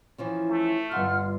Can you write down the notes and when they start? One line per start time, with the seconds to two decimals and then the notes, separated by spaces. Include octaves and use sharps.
0.18 E3 F3 C#4
0.49 A3
0.91 G1 F4 F#5 C6 F6